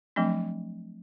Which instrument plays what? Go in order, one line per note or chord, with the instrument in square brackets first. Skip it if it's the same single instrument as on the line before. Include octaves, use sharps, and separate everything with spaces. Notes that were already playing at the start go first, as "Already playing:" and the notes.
[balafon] F3 F#3 A3 C4 D4